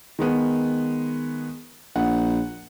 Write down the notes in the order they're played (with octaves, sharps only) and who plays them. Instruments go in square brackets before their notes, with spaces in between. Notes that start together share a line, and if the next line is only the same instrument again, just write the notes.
[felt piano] D#3 G#3 B3
[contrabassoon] A#1 [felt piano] F#5